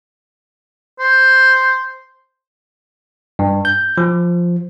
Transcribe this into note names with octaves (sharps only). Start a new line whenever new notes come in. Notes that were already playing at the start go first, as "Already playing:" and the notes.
C5
G2
G6
F3